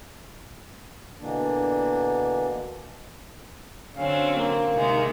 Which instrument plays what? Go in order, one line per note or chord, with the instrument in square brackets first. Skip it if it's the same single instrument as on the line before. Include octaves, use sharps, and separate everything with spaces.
[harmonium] B2 D3 E3 A#3 D4
[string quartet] D3 F#3 C4 [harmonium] C#4 F5
[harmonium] A#3
[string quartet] C3 D#3 G#3